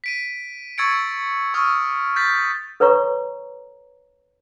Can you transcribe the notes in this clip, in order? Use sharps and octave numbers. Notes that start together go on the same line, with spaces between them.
B6 D7 D#7
C#6 E6 G#6 A6 C#7 D7
C#6 D#6 F6
G6 A6 B6
A4 B4 C#5 A#5 C#6